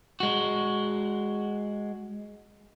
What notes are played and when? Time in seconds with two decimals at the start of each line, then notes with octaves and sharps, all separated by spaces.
0.20 G#3 F#4